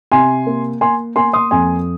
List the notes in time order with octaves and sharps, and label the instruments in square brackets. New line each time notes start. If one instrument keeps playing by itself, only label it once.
[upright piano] C3 G#5 C6
A#3
A#3 G#5 C6
A#3 G#5 C6
C6 D#6
F2 G#5 C6